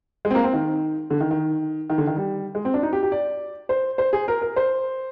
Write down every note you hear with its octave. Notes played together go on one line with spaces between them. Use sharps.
G#3
C4
A#3
C4
D#3
D3
D#3
D#3
D#3
D3
D#3
G3
G#3
C4
D4
D#4
G4
G4
D5
C5
C5
G#4
A#4
A#4
C5